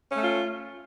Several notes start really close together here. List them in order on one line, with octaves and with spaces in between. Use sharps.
C#4 A3 F4